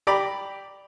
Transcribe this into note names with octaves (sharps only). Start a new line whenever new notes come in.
G4 D5 A#5 B5 D6